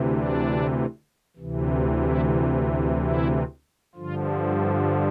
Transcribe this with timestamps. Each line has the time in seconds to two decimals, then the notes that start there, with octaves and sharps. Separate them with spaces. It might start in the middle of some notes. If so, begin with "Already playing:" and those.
Already playing: D2 C3 E3
0.08 D4
1.37 D2 C3 E3
2.02 E4
2.66 E4
2.99 E4
3.95 G2 D3 F3 F4
4.60 E4